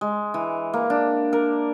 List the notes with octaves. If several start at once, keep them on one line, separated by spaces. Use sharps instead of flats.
G#3
E3
A#3
D4
A#4